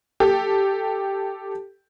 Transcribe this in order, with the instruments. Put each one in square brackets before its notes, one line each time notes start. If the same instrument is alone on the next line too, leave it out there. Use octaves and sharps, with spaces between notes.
[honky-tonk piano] G4 A4